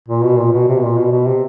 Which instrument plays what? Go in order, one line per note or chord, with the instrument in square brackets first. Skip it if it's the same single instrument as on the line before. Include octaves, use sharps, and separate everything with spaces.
[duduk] A#2
B2
A#2
B2
C3
B2
A#2
B2
B2
C3